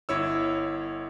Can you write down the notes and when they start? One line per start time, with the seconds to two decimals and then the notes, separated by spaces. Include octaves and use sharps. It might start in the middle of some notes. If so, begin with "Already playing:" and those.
0.09 G1 E4 C#5 E6